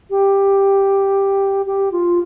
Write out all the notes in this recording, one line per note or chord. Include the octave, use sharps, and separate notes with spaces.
G4
G4
F4